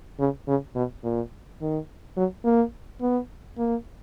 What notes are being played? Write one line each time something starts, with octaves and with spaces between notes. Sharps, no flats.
C#3
C#3
B2
A#2
D#3
F#3
A#3
B3
A#3